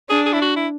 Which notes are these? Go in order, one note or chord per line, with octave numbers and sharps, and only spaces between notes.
D4 G#4
G#4
E4
F#4
E4